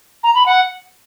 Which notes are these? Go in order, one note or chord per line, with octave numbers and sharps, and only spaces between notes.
A#5
B5
F#5